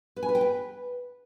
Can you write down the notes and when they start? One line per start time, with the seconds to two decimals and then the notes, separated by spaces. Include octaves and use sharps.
0.16 B4
0.23 G#5
0.29 B4
0.35 G5
0.41 B4